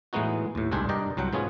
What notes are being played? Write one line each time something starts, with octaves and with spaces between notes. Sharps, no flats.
A2 E3 G#3 B3 D#4 F#4
D#2 A2
C2 G#2 D4 G4 G#4 C5
G2 A#4 D5 D#5 G5
C2 F#3 F#5 G5
G#2 B3 C#4 F4 G#4